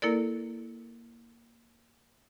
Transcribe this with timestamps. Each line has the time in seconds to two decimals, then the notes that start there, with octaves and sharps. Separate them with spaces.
0.02 A#3 E4 A4 A#4 D5